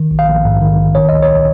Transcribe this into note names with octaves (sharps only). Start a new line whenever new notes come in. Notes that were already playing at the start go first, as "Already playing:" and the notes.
Already playing: D#3
A#1
F5
A#1
G#2
D#3
A#1
D#3 C#5
C#2 D#5
C#5